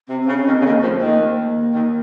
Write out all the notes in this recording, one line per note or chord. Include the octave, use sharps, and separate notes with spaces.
C3 C4
C4
C#3
C#4
D#2 D#3
C4
C#3
D#2 D#3 A#3
F2 F3 A3
D#2 D#3 A#3
A#3
D#2 D#3